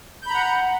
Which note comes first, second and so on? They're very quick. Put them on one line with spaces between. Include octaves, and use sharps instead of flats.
G6 B5 A#5 F#5